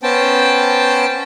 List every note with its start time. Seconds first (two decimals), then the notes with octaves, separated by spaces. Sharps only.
0.03 B3 C#4 C5 G5 A5